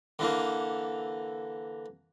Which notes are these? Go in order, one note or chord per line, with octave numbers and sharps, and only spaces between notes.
D3 E3 A#3